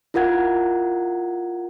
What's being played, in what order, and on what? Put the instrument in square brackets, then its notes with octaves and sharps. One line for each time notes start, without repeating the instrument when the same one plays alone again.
[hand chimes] E4 F4 A#4 F#5 G#6